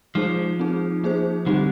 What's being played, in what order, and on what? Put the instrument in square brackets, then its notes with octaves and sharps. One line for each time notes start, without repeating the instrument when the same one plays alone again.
[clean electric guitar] F3 [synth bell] G#3 D#4 G#4 C5
[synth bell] C4 D#4 G#4
A#3 D#4 G#4 C5
[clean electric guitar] D3 [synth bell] G3 C4 D#4 G4